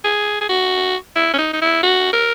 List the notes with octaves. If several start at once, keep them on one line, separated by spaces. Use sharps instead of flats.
G#4
G#4
F#4
E4
C#4
D#4
D#4
E4
F#4
A#4